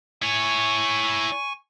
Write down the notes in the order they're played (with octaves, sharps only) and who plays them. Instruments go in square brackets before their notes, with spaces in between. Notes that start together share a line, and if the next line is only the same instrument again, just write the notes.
[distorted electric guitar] E4 C#5 [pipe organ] G#5 C#6